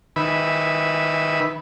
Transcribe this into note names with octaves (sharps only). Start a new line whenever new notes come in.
D#3 B4 E5 B5